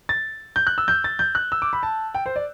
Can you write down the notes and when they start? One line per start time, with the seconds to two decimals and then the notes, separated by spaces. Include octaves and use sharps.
0.09 A6
0.56 G6
0.67 F#6
0.78 E6
0.88 G6
1.04 A6
1.19 G6
1.35 F#6
1.52 E6
1.62 D6
1.73 B5
1.83 A5
2.15 G5
2.26 C5
2.36 D5